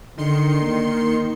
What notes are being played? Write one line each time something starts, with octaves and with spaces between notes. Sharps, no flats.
D3 D#3 C6 C#7
A#3